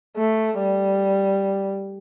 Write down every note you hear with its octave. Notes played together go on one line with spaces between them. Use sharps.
A3
G3